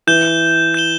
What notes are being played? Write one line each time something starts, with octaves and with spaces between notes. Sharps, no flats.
E3 G6 E7 G7
G6 E7 G7